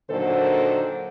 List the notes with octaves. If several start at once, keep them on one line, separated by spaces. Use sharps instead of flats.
A#2 D3 D#3 F#3 A4 C5